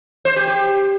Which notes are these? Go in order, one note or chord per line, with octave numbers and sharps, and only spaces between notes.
C5
G4
G4